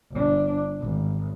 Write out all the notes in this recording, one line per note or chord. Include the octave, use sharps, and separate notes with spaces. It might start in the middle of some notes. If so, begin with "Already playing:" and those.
G1 D4
G#1